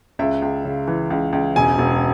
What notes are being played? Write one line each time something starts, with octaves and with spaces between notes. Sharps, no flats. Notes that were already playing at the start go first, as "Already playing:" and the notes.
C#2 E5
C#2
C#3
E3
C#2
C#2
E1 G#5
E1